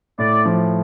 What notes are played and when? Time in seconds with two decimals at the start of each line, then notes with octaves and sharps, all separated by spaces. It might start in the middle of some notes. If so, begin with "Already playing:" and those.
0.19 A2 D5
0.45 F3